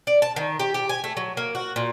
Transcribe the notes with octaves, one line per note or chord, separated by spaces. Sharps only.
D5
A5
D#3
G4
G4
G#5
A3
F#3
A#3
F#4
A#2